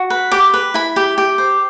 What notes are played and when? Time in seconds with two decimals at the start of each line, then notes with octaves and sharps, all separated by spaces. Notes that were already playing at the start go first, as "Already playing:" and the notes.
Already playing: F#4
0.10 B4
0.32 G4 D6
0.54 B4
0.74 E4 B5
0.96 G4
1.18 G4
1.38 C5